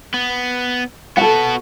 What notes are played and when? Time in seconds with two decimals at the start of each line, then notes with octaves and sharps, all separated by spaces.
0.14 B3
1.17 B3 F#4 A4 F#5